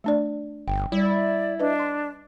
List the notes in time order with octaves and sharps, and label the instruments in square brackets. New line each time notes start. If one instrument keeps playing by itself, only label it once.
[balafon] A3 D4 D5
[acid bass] G1 [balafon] G5
[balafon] G3 [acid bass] E4 [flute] D5
[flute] D4 [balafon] B4 D#5
[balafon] C6